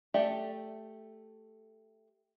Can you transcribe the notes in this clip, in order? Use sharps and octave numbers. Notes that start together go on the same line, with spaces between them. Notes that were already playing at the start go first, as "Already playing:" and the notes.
A3 G4 A4 D5 E5